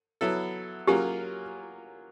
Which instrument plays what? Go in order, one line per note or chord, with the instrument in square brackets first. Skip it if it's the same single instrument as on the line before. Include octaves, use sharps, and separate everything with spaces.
[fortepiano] F#3 B3 E4 A4
[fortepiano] F#3 A#3 C#4 F4 G#4 [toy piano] G4